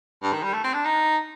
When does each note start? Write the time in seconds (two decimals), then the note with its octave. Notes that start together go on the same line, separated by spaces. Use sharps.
0.23 G2
0.33 D#3
0.43 G3
0.53 A3
0.64 C4
0.74 D4
0.85 D#4